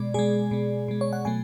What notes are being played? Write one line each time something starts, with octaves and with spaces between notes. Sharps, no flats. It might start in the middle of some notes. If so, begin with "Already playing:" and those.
Already playing: B2 G#3 D5
B2 G#3 G#4
B2 G#3
B2 G#3
C#5
F#5
B2 F#3 A3 G#5